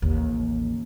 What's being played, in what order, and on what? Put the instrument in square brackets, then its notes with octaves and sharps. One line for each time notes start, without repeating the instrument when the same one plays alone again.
[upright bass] A1 D#2